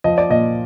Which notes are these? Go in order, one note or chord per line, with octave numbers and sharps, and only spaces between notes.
F3 D#5
D5
A#2 D#5